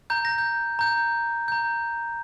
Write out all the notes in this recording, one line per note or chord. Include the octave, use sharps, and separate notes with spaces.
A#5 G6
A#6
G6
A#5 G6
A#5 G6